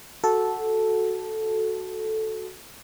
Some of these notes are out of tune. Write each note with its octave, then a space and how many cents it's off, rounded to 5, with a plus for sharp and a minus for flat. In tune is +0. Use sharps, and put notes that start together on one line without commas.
F#4 +0 A4 -5